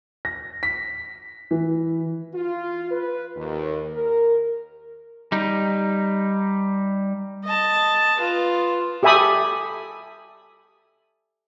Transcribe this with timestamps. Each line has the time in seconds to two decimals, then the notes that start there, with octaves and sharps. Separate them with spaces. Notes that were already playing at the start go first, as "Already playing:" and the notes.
0.25 A#6
0.63 B6
1.51 E3
2.34 F4
2.91 B4
3.37 D#2
3.93 A#4
5.32 G3 D#4
7.44 D#5 A5
8.19 F4 B4
9.03 G4 A4 E5 G#5 B5 D#6